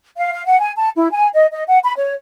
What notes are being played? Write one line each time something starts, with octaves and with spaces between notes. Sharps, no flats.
F5
F5
F#5
G#5
A5
E4
G#5
D#5
D#5
F#5
B5
C#5